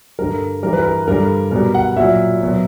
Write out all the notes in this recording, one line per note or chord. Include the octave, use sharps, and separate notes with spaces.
G2 D3 G3 A#4
G2 E3 G3 A#4
B4
A#4
G2 D3 G3 A#4
B2 G3 A#4
F#5
A#2 F#3 E5
B2 F#3